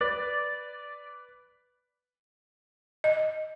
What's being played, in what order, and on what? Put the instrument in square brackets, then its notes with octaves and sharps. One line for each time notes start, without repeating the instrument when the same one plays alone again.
[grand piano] B4 [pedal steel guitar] D5
[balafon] D#5